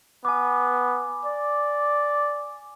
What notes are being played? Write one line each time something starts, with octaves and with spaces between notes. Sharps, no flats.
B3 G#5 D6
D5